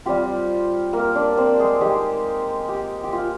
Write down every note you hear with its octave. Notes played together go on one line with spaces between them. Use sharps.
G3 C4 F4 G4
A#3 A#4
D4 D5
C4 C5
G#3 G#4
G#3 D#4 G4
G4
G4
F4